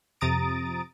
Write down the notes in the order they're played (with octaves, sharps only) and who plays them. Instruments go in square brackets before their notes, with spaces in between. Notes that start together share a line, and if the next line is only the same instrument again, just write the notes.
[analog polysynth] F2 C3 A#5 D#6 A6 D7